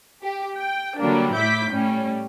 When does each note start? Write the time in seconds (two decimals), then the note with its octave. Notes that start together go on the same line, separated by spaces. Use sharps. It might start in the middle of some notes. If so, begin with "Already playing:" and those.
0.23 G4
0.58 G5
0.98 D3 F#3 G3 A#3 D4
1.34 A2 E4 D6 G6 B6
1.72 A2 G3 C#4